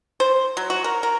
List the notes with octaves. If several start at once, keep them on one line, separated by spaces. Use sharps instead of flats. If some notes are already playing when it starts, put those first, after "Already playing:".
C5
F#3
F#4
A#4
A#4